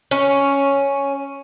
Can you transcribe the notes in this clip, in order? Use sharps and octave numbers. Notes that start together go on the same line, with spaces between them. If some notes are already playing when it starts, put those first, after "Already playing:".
C#4